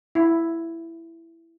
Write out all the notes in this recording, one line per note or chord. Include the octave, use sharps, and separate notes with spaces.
E4